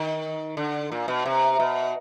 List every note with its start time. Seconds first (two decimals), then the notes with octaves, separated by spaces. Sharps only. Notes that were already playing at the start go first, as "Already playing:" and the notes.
Already playing: D#3
0.57 D3
0.92 A#2
1.08 B2
1.26 C3
1.60 B2